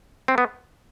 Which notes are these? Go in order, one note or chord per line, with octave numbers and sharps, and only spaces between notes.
C4
B3